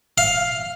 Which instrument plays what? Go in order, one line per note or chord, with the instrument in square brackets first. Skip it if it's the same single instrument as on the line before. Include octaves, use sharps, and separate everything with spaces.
[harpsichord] F5